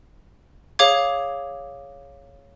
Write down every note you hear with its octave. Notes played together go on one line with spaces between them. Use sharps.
G#4 C#5 F5 D6 G#6